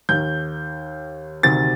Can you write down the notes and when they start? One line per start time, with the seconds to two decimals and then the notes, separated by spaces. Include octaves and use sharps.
0.09 D#2 D#3 G6
1.43 D2 C3 D#3 A6